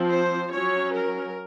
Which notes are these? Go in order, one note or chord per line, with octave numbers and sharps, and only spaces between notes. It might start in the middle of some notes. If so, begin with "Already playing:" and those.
Already playing: F3 C4
C5
F#3 C#4 C#5
A#4